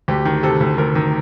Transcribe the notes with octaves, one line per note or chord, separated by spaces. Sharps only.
D2 G4
D#3
C3 A4
D2
D2 A#4
D#3